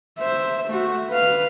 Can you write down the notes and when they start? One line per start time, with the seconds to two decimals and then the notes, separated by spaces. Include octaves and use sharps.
0.19 C5 E5
0.67 A3 F#4
1.10 B4 F5